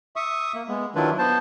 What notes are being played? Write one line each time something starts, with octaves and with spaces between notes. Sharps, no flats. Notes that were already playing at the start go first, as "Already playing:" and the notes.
E5 C#6 D#6
A#3
G#3 B3
D#3 F#3 D4 E4 F4 B4
B3 C5 A5